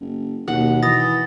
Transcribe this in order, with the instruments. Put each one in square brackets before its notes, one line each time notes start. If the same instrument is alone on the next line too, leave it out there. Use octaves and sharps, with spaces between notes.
[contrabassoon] F#1
[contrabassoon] D#2 [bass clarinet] B2 [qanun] F#5
[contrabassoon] E3 [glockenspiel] D#6 A6 A#6